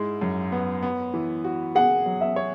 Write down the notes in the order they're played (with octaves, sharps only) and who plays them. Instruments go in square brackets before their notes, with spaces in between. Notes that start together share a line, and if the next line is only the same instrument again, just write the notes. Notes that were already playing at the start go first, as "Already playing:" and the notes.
Already playing: [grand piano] G#2 G#3 E4
F#2
B3
B3
E3
F#4
[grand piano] G#4 [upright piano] F#5
[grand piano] F#3
[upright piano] E5
[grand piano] C#5